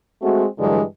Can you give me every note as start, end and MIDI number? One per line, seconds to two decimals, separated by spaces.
0.22 0.45 56
0.22 0.45 57
0.22 0.45 60
0.22 0.45 66
0.59 0.81 43
0.59 0.81 50
0.59 0.81 52
0.59 0.81 54
0.59 0.81 56